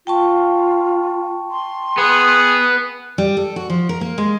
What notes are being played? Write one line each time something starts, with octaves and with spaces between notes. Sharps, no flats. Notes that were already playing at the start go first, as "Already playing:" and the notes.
F4 G5 A5 C#6
C6
B3 G#4
G3
A4
F#4
F3
A#4
A#3
G#3